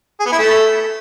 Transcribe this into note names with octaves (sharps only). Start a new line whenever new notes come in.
G#4
B3
E4
A3